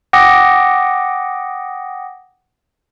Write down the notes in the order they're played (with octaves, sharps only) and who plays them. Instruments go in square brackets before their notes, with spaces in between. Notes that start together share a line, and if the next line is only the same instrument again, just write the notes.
[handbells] F#5 G5 D6 D#6 A#6